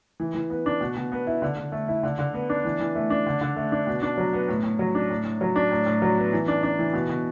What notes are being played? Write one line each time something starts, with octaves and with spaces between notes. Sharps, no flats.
E3
E3
B3
D4
B2
B2
B3
E4
D3
D3
A3
E4
D3
D3
B3
D4
E3
E3
A3
D4
D3
D3
A3
D4
B2
D4
F#3
B3
A2
A2
F#3
D4
A2
A2
F#3
D4
A2
A2
F#3
B3
E3
D4
D4
E3
B2
B2